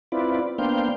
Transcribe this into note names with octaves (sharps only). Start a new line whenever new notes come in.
C4 E4 F4 B4 D5
A#3 B3 D4 C5 F5 G5